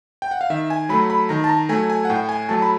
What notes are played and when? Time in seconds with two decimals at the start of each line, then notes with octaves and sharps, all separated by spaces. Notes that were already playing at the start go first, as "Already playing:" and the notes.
0.22 G5
0.31 F#5
0.41 F5
0.50 D#3 E5
0.70 G#5
0.89 F#3 A3 B5
1.10 B5
1.29 D#3 A#5
1.44 A5
1.49 A#5
1.69 F#3 A3 G#5
1.90 G#5
2.05 F#5
2.09 A2 G5
2.29 G#5
2.49 F#3 A3 A5
2.62 B5